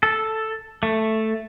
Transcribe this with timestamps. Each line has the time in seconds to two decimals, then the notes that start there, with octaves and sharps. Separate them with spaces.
0.03 A4
0.83 A3